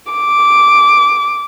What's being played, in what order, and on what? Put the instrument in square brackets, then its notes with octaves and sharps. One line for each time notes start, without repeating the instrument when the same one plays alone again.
[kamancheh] D6